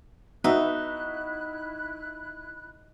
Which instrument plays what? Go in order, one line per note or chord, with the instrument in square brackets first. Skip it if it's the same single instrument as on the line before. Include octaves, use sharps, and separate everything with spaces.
[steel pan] B3 [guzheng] D#4 [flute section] E4 F#6 [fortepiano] F#4 E5